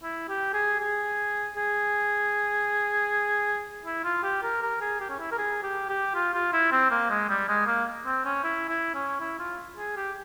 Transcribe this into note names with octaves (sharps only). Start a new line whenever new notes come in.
E4
G4
G#4
G#4
G#4
E4
F4
G4
A#4
A#4
G#4
G4
C#4
E4
A#4
G#4
G4
G4
F4
F4
E4
C4
A#3
G#3
G3
G#3
A#3
C4
C#4
E4
E4
C#4
E4
F4
G#4
G4